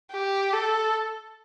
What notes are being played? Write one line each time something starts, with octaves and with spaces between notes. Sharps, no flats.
G4
A4